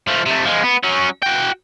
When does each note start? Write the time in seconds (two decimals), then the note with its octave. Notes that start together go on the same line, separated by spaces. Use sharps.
0.08 F3 A3
0.26 C3 A3
0.45 F3 G#3
0.63 B3
0.83 F#3 C#4
1.22 F#4 G5